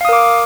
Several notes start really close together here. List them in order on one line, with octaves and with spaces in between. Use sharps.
F5 D#6 A#4 D6